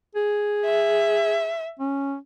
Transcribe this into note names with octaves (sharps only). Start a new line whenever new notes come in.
G#4
E5
C#4